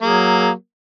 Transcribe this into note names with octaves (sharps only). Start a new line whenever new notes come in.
F#3 A#3 G#4